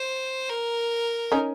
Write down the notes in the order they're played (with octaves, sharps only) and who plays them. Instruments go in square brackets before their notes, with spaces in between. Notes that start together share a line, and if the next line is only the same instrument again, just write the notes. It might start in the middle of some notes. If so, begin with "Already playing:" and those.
Already playing: [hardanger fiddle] C5
A#4
[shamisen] C#4 D#4